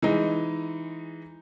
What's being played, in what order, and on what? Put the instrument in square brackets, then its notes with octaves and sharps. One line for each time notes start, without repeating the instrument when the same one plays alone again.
[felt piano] E3 G#3 D#4